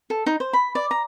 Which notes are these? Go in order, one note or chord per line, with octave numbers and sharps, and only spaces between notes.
A4
D#4
C5
B5
D5
A#5